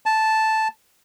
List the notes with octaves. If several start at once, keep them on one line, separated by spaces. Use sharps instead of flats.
A5